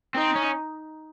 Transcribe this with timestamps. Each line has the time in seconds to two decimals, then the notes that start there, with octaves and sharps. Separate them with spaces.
0.15 C4 D#4
0.35 C#4